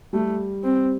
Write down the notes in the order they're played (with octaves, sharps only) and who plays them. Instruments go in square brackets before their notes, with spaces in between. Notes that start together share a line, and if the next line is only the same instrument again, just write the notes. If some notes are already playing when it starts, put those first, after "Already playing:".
[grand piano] G3 [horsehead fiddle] A3
[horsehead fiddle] C4